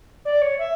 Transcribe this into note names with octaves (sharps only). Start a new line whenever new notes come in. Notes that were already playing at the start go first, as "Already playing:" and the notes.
D5
C#5
E5